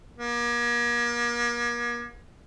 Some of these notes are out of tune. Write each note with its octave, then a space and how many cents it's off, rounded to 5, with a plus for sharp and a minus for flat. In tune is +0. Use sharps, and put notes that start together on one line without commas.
A#3 +40